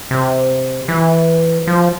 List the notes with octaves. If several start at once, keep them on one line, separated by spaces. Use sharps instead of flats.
C3
E3
F3